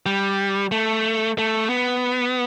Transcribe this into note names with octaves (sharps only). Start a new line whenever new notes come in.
G3
A3
A3
B3